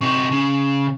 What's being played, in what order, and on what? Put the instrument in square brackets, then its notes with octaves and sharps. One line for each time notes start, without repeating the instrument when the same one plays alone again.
[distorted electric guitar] C3 D#4 [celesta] C#6
[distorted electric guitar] C#3